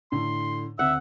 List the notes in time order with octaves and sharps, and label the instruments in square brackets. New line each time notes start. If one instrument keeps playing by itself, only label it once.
[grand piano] A2 D3 [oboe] C6
[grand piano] D2 C4 [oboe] E5 [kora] F#5 [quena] E6